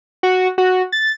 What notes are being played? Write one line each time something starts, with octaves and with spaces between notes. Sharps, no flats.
F#4
F#4
A6